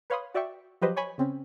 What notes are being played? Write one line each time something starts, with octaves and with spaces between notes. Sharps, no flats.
B4 C#5 F5 B5 C6 D#6
F#4 D5 E5 G5 C#6
F3 F#3 G4 B4 C5 D#5
C#5 G#5 B5 C#6
C#3 C4 C#4